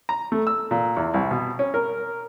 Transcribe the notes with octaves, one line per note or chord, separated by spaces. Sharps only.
A#5
A3
E6
A#2
E2
C2
B2
C#4
A#4